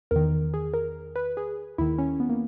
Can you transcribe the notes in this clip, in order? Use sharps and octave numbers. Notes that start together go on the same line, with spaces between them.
E2 D#3 A#4
G#4
A#4
B4
G#4
D#2 D#3 E4
C#4
B3
A#3